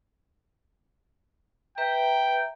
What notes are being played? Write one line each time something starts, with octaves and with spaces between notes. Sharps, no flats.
B4 E5 G5 A#5